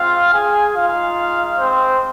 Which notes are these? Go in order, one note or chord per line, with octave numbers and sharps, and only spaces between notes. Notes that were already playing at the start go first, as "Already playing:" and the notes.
Already playing: G#3 C4 F4 F5
G#4 G#5
G#3 D#4 F4 F5
C4 C5